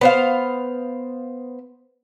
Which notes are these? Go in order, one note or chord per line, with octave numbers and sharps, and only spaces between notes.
B3 C5 F5